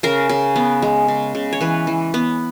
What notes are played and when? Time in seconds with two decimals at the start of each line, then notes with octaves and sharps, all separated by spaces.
0.03 C#3 A#4
0.29 C#3
0.56 B3
0.82 G#3
1.08 C#3
1.35 C#3
1.53 C#5
1.61 E3 B4
1.87 E3
2.14 B3